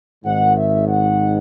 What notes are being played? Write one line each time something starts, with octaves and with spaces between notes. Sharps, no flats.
G#1 G#2 D#3 F#5
E5
F#5